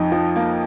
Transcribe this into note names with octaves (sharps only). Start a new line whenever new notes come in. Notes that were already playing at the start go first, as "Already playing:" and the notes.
Already playing: F2 D#4
F3
A#3